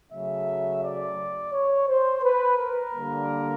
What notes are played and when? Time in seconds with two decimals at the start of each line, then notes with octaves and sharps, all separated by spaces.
0.12 C#3 F#3 A3 E5
0.83 D5
1.52 C#5
1.87 C5
2.23 B4
2.57 A#4
2.93 D3 G3 A#3